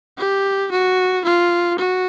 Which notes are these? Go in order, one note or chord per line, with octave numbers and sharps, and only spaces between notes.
G4
F#4
F4
F#4